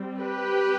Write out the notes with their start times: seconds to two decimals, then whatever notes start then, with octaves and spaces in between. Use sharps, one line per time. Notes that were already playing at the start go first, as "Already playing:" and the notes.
Already playing: G3 C4
0.21 G4 B4